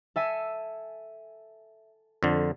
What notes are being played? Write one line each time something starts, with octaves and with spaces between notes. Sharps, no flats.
A4 E5 G#5
F2 D3